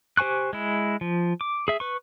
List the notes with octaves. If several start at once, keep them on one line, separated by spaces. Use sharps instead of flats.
G4 C5 G#5 C#6 F#6
G#3 E4
F3
D6
G#4 E5
B4 C#6